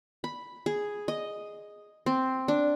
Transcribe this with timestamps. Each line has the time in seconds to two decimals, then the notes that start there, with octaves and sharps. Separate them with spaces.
0.24 B5
0.66 G#4
1.08 D#5
2.06 C4
2.48 D4